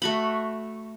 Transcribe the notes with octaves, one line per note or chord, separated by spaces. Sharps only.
A3 F#4 B5